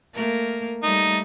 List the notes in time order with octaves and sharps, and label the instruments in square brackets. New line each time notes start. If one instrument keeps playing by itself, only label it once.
[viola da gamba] A3 A#3 A#4
[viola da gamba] G3 A3 [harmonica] D#4